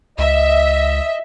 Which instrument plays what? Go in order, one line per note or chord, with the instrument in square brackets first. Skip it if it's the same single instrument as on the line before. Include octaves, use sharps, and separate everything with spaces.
[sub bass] C#2 [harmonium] D#5 [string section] E5